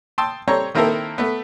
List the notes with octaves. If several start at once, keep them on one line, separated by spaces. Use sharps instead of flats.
G5 A5 C6 D#6 E6
G3 C4 A4 C#5 A#5 C#6
D#3 A#3 C4 E4 A4 A#4
A3 B3